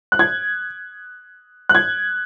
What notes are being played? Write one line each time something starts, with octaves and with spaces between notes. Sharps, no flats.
F#6
G#6
F#6
G#6